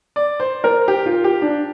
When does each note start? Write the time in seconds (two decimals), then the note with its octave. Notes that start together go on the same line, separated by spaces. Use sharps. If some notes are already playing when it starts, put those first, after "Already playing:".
0.16 D5
0.40 C5
0.64 A#4
0.88 G4
1.06 F4
1.24 G4
1.42 D4